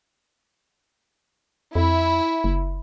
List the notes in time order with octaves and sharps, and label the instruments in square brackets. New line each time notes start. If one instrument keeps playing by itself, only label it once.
[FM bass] F2 [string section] E4
[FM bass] F#1